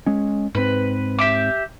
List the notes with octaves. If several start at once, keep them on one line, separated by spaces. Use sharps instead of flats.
G#3 C#4
G#2 C4 B4
G4 E5 D6